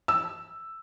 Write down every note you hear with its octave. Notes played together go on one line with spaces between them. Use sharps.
E6